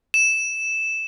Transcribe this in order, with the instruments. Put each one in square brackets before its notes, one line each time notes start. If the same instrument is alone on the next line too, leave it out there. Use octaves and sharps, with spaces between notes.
[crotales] E7